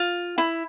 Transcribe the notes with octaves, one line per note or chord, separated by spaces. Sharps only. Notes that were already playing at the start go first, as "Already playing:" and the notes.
Already playing: F4
E4